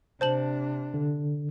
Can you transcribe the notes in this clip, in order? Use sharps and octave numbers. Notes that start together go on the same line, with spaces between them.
C3 D4 C5 A5 F#7
D3